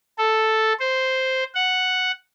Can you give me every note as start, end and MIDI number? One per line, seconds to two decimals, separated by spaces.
0.18 0.73 69
0.80 1.44 72
1.55 2.11 78